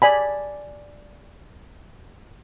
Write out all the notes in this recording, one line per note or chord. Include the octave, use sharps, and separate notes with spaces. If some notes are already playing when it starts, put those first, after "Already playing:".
D5 G#5 B5